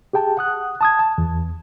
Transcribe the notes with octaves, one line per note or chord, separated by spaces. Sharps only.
G4 G#4 G5 A5
F#5 D#6 F#6
A5 D#6 G#6
A5
E2